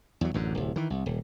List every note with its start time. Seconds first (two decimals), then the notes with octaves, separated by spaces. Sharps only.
0.21 E2 F#3
0.34 A1 F#2 D3
0.55 D1 C2
0.76 D#3 E3
0.90 C2
1.06 D#1